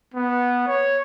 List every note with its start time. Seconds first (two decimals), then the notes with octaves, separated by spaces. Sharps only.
0.14 B3
0.67 C#5